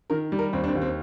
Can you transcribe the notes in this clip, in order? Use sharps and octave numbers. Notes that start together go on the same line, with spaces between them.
D#3 A#4
G3
A#4
D#2 C4
D4
C4
D#2
C4